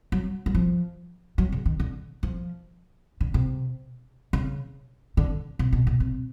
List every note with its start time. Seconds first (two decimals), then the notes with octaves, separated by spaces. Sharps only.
0.12 F#3
0.46 F#3
0.55 F3
1.38 F#3
1.52 C#3
1.66 D#3
1.80 D3
2.23 F3
3.21 D3
3.34 C3
4.33 C#3
5.17 D3
5.59 C3
5.73 B2
5.87 B2
6.00 C3